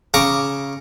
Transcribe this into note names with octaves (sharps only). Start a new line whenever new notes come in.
C#3 A#5 C#6 D6